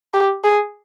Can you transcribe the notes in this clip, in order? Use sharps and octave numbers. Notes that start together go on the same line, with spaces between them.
G4
G#4